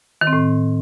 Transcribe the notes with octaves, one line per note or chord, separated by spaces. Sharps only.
D#3
C4
A2